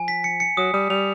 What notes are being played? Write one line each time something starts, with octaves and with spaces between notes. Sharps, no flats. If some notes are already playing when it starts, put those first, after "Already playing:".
Already playing: F3 G#5
B6
C#7
C#7
F#3 D#6
G3 D#6
G3 F7